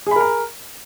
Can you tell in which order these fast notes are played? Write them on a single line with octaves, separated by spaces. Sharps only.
G#4 B5 A#4 A#5